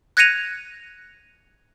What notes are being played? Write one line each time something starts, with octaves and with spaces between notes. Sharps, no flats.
F#6 G#6 A#6 C#7 D#7 F7